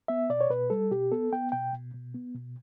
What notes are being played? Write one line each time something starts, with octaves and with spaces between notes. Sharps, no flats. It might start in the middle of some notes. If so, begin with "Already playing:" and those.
B3 E5
B2 D5
C#5
B2 B4
G3 A4
B2 G4
B3 A4
B3 G5
B2 G5
B2
B2
B3
B2